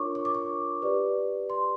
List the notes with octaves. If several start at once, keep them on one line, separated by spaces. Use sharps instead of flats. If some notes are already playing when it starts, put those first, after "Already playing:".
Already playing: D4 F4 A#4 C#5 C#6 D6
C#6
D6
C#6
G4 B4 D5
C6